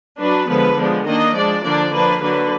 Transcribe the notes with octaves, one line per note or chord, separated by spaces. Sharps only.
F#3 D4 B4
D3 F3 G#3 B3 B4
F3 G#3 B3 D4
D#3 A#3 D4 D#5
F3 G#3 D4 D5
D3 F3 A#3 D4 D5
F3 A#3 D4 B4
D3 F#3 A#3 D4 B4